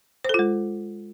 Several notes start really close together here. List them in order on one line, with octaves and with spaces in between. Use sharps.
C5 A4 F4 G#3